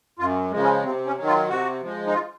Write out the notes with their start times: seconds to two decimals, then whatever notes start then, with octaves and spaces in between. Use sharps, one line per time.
0.19 F#2 F4
0.51 C#3 F3 G#3
0.63 C#4
0.84 C3 C4
1.06 C#4
1.17 D#3 F#3
1.27 F4
1.49 C3 F#4
1.82 F3 G#3
2.07 D#4
2.14 F4